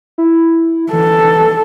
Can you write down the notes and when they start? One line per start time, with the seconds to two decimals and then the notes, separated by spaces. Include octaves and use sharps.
0.18 E4
0.93 E3 A4